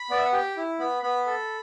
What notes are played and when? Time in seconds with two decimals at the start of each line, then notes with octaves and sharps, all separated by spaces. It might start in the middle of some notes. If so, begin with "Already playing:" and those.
Already playing: B5
0.10 B3 D5
0.18 E5
0.25 F#5
0.33 G4 G5
0.57 E4
0.79 B3 B5
1.02 B3 B5
1.26 A4